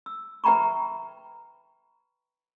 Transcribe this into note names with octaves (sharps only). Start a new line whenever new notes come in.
E6
B4 E5 G5 A#5 B5 C#6